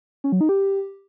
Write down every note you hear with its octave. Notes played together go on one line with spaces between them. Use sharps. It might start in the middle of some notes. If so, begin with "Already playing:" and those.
C#4
F#3
D#4
G4